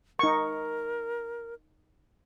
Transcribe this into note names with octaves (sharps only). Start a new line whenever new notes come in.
D#4 A#4 C#6